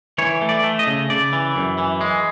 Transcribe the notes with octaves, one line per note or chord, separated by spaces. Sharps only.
E3 C#5
A3
D5
A3
D#5
C#3
C#3 D5
E3
F#2
E3
G#3